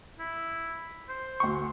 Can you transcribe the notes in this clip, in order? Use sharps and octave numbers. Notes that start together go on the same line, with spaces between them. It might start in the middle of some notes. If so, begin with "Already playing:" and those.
E4
C5
D2 F#4 C6 C#6